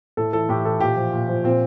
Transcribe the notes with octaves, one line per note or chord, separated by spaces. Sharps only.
A2 A4
E3 A4
A2 G4
E3 A4
A#2 G4
F3
A#2
F3
A#2 C4